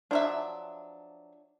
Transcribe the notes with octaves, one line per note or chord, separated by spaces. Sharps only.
F3 F#3 D4 E5